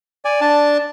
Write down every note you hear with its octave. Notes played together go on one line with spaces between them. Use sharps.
D5 G#5
D4 A5